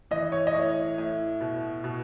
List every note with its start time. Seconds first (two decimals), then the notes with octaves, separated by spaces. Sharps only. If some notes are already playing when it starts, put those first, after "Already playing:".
0.11 E3 D#5
0.32 C#5
0.47 D#5
0.54 A2 C#5
0.98 A2
1.41 B2
1.84 B2